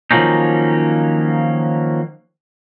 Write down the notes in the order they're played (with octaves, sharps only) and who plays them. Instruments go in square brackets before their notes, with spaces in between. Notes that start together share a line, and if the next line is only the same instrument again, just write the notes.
[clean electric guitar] D#3 F3 F#3 A#3 C#4 D#4